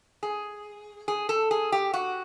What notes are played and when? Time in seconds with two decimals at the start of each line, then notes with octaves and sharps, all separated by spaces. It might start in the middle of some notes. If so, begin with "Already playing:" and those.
0.23 G#4
1.08 G#4
1.29 A4
1.51 G#4
1.72 G4
1.94 F#4